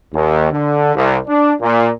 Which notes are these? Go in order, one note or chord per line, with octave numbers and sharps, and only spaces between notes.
D#2
D3
C2
D4
A#2